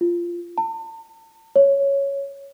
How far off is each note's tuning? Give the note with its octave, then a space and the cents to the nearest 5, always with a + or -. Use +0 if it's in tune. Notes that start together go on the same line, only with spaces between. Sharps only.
F4 -10
A5 +40
C#5 +0